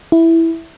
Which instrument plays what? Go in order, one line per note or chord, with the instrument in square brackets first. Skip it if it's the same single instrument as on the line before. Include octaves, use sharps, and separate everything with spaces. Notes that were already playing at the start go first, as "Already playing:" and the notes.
[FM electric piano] E4